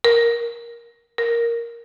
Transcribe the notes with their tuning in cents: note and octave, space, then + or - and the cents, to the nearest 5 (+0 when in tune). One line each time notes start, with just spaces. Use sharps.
A#4 +10
A#4 +0